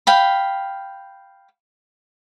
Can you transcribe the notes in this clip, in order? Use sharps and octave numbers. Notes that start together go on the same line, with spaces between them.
F5 G5 B5